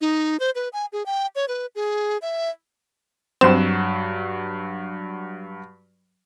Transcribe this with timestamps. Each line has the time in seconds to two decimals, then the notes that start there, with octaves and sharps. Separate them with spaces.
0.01 D#4
0.40 C5
0.55 B4
0.73 G#5
0.93 G#4
1.06 G5
1.36 C#5
1.48 B4
1.75 G#4
2.22 E5
3.41 G2 F#3 C4 E7